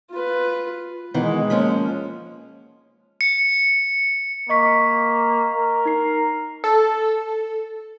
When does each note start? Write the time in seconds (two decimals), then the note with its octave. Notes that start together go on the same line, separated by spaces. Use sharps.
0.11 F4 B4
1.14 B2 D#3 E3 G#3
1.50 F3 A#3 C#4
3.21 C#7
4.49 A#3 D#5 C#6 B6
5.56 A#4
5.85 D#4 A#5 C7
6.64 A4